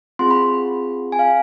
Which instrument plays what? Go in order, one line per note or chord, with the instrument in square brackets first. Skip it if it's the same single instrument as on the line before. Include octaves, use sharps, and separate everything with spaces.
[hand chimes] C4 F4 G#4 C6
B5
G#5
F5